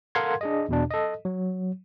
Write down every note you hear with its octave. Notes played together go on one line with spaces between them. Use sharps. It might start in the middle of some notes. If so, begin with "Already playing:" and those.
A4 A#4 F5 F#5 C6 G#6
D4 G#4 D#5
E2 B2 D4
A4 D#5
F#3